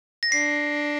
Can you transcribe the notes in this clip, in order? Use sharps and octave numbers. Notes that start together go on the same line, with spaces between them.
A#6
D4 C7